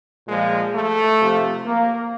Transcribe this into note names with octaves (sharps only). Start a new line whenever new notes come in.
A#2 F3 G#3
A3
C3 F3
A#3